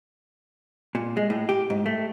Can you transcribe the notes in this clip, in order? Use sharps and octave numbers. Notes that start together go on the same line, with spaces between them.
A#2
G#3
A2
G4
G#2
A3